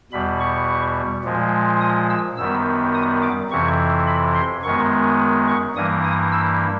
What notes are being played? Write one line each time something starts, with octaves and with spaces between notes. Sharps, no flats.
E2 B2 G3 B5
C#6
A#2 F3 G#3
D#6
E6
F#2 D#3 G3 B3 E6
D#6
D6
F2 C3 E3 C#6
B5
C6
F#2 D#3 G#3 B3 C#6
C#6
G2 E3 G3 A#3 D#6
D#6
E6